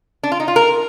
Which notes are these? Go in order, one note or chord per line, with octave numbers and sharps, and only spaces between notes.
D4
F4
D#4
F4
A#4